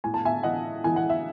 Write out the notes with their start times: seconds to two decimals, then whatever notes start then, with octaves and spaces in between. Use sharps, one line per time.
0.04 A2 G#5
0.14 A5
0.25 E5 G#5
0.43 E3 D#5 F#5
0.84 E3 G#5
0.96 F#5
1.10 E5